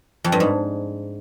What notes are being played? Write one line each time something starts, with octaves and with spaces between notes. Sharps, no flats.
F2
G2
G#2